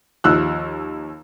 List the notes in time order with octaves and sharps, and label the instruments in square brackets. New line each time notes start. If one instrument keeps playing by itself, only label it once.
[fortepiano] D#2 F3 E6 F#6